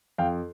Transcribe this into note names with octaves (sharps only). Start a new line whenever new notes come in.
F2 F5 G5